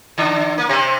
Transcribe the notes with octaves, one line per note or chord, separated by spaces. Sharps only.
D3 D4
A#3
C3 C4